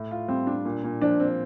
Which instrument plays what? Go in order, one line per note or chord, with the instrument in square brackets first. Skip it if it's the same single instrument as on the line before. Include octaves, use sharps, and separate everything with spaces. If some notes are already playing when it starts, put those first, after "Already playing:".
Already playing: [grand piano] A2
F4
[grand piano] G3 [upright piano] C4
[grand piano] D4
A#2
A#2
[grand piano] F3 [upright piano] D4
[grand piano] C4